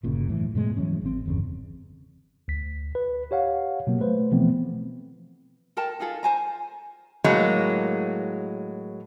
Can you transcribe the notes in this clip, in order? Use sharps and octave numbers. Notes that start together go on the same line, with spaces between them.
G1 A#2 C#3
F#2 A2 C#3 E3
G#2 B2 G#3 A3
E3 F#3 G#3 C#4
G#1 C4
G1 E2 C#3
D2 B6
B4
G4 C#5 F5 F#5
B2 F#3 A#3
A3 B4 C5
B2 E3 F3 A3 B3 C4
A4 A#4 G5 A5
D#4 F4 G#4 A4
C5 G#5 A#5
A2 F#3 G#3 A#3